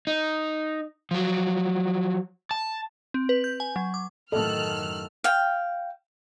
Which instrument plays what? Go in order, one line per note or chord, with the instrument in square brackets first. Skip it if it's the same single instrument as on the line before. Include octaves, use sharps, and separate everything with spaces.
[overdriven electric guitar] D#4
F3 F#3
A5
[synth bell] C4
B4
G6
G#5
F#3
D6
[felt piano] A1 D#5 [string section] F#2 F6 F#6 [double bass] D#3 F#3 [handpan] A4
[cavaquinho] F5 G5